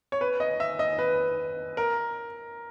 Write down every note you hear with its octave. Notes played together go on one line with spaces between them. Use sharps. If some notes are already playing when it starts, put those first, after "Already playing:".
C#5
B4
D#5
E5
D#5
B4
A#4